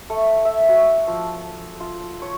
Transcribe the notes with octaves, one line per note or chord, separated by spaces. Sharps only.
A3
E5
F#4
F3
F4
C#5